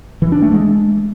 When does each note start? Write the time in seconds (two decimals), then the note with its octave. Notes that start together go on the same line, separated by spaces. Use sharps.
0.22 E3
0.32 D4
0.42 A3
0.52 G#3